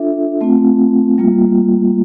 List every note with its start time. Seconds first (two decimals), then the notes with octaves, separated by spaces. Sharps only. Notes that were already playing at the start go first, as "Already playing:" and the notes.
Already playing: D4 F4 A4 E5
0.41 A3 C4 F4
1.18 G3 A#3 F4